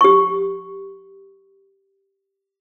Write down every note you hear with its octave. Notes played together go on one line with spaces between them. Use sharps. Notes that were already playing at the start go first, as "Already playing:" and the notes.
G4 C#6